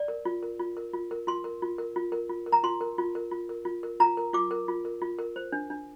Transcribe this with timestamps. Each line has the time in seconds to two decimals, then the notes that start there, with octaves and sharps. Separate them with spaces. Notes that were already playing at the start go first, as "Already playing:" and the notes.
Already playing: D5
0.08 A#4
0.25 F4
0.43 A#4
0.59 F4
0.77 A#4
0.94 F4
1.11 A#4
1.27 F4 C6
1.44 A#4
1.62 F4
1.78 A#4
1.96 F4
2.12 A#4
2.30 F4
2.46 A#4
2.52 A#5
2.63 F4 C6
2.81 A#4
2.98 F4
3.15 A#4
3.31 F4
3.49 A#4
3.65 F4
3.83 A#4
4.00 F4 A#5
4.17 A#4
4.33 F4 D6
4.51 A#4
4.68 F4
4.85 A#4
5.02 F4
5.19 A#4
5.36 C5
5.52 D4
5.70 D4